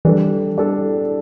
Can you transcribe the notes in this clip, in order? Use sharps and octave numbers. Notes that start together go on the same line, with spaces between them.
E3 G3 D4 A4
G3 D4 A4